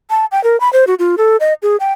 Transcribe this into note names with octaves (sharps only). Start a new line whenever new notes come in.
A5
G5
A#4
B5
C5
F#4
F4
A4
D#5
G#4
G5